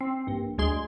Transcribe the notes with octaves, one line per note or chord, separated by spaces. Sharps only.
C4
A#1 G2
D2 G#3 G#4 C6